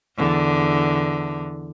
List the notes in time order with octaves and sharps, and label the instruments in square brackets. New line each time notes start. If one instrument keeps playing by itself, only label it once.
[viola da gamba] E2 D3